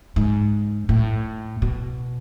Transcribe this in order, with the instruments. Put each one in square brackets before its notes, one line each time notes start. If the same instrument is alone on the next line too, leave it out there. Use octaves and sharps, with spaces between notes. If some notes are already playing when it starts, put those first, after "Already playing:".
[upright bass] G#2
A2
B2